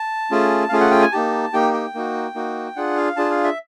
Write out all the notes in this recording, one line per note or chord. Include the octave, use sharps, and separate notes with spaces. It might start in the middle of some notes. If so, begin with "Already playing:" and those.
Already playing: A5
A3 C#4 F4 G#4
A3 C#4 F4 G#4 F5
F#5
G5
G#5
A#3 D#4 G4 A5
A#3 D#4 G4 G5
G5
A#3 D#4 F#4
A#3 D#4 F#4
D4 F4 G#4 F#5
F5
D4 F4 G#4 A5
F5
E5